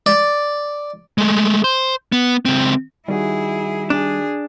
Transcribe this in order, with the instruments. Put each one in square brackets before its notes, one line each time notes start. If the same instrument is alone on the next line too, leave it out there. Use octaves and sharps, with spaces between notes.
[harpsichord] D5
[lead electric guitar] G#3 A3
C5
B3
C#2 C4
[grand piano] D#3 F#4 [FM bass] G3 [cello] E4 G#4
[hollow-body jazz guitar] D4 [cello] G#4